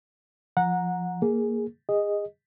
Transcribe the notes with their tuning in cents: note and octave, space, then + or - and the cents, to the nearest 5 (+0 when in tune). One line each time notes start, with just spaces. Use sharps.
F3 +0 F#5 -20 A#5 +0
A#3 +0 G#4 +0
G#4 -30 D#5 +0